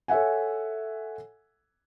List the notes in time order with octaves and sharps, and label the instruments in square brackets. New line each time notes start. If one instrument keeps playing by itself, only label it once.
[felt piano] A4 C#5 E5 F#5 G#5